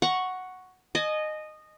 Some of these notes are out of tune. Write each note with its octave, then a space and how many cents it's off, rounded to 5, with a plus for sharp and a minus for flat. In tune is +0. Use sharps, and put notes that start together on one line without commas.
F#5 +0 A#5 +15 C#6 +0
D#5 -15 G#5 +40